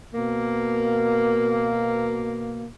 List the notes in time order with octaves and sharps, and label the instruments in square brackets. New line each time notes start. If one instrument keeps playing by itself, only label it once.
[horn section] B2 A#3